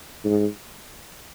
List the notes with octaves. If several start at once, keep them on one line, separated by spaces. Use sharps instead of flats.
G#2